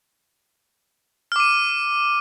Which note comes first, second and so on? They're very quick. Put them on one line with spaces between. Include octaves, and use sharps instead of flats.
F6 D6 D#7